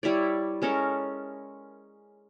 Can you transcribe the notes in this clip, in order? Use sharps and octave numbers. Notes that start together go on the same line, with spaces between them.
G3 E4 C#5 D5
G#3 C#4 A4 A#4